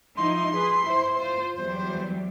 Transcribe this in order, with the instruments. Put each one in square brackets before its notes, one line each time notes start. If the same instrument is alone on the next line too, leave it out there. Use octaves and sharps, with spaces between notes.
[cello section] F3 D#4 E4 [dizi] C6
[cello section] G#4 B4
E4 C5
F4 C5
[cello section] E2 F#3 G3 [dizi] C5